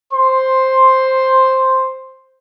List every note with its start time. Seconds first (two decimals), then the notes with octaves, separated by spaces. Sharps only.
0.12 C5 C6